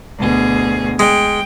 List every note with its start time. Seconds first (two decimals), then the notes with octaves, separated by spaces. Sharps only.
0.17 D2 B2 G#4
0.99 G#3 G5